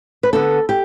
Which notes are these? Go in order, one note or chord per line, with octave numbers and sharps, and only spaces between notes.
B4
D3 B3 D4 A4
G4